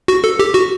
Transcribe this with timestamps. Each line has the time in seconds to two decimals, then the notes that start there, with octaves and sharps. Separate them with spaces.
0.08 F#4
0.24 A4
0.39 G4
0.54 F#4